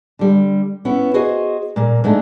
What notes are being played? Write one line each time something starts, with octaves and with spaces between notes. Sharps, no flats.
D3 G3
B3 C#4 E4
F#4 G#4 C5 D#5
A#2 A#3
G#2 G#3 A3 D4